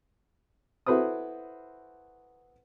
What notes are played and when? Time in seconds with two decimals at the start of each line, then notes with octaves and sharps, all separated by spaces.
0.86 E4 F#4 A4 B4 C5 D#6